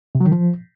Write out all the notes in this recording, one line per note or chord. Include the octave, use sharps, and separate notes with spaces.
C3
F#3
D#3
F3